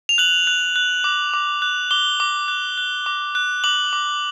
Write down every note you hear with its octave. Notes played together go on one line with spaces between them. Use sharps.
F7
F#6 F#7
F#6
F#6
D6
D6
F#6
D6 G7
D6
F#6
F#6
D6
F#6
D6 F#7
D6